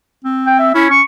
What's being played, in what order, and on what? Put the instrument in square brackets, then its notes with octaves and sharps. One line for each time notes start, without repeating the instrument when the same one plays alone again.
[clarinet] C4
[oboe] G5
E5
[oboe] C#4 [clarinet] E4
[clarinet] C#4 [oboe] C#6